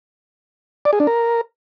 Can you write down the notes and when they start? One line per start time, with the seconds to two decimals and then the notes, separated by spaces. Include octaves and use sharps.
0.85 D5
0.93 G#4
1.00 D4
1.07 A#4